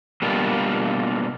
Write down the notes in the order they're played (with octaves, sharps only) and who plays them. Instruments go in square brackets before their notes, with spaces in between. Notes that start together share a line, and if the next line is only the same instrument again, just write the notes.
[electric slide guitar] B2 G3 A#3 D4 F4